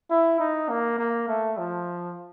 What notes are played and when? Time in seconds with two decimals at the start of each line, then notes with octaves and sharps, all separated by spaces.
0.10 E4
0.40 D#4
0.69 A#3
0.99 A#3
1.28 A3
1.58 F3